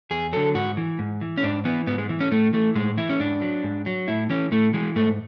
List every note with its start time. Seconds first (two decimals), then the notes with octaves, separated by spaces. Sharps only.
0.11 E2 G#4
0.33 D3 F#3 A4
0.55 G#2 F#4
0.77 E3
0.99 G#2
1.21 E3
1.38 C#4
1.43 G#2 D4
1.65 E3 B3
1.87 G#2 B3
1.98 G#3
2.09 E3
2.20 C#4
2.31 A2 A3
2.53 E3 A3
2.75 A2 G#3
2.98 E3 E4
3.09 C#4
3.20 G#2 D4
3.42 F#3
3.64 G#2
3.86 F#3
4.08 A2 E4
4.30 E3 C#4
4.52 A2 A3
4.74 E3 G#3
4.96 G#2 A3